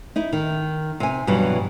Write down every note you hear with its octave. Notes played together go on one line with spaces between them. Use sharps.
D#4 E4
D#3
C3 G#5
G2 B2 E3 F#3 G3